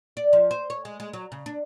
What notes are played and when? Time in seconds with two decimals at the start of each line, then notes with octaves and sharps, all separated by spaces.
0.17 D5
0.33 F3
0.51 C5
0.70 C#5
0.85 G#3
1.00 G#3
1.13 F#3
1.32 C#3
1.46 D4